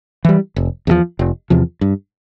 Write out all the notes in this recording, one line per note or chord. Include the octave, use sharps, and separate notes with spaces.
E3 G3
F1
E2 C3 F3
F1
E2 C3 F3
G2